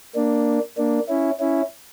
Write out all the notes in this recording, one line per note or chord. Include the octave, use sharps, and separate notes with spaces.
A#3 D4
A#3 D4
C#4 E4
C#4 E4